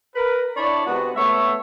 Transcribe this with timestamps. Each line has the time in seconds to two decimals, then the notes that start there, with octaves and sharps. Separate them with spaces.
0.16 A#4 B4
0.56 D4 E4 C#5 D5 A5 B5
0.86 C3 G#3 B3 F#4
1.16 A3 B3 C#5 E5